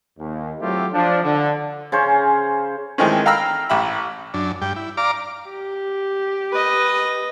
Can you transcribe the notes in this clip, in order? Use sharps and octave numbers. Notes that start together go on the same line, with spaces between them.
D#2
F#3 A3 C4 E4 F4 G4
F3 D4
D3
C#3 C#4 C5
D#3 E3 G#3 A3 C4 C#4
F5 G5 A#5 B5 E6 F6
A1 G4 E5 B5
F#2 D4
G2 G5
E4
D5 F5 A#5 D6
G4
B4 D#5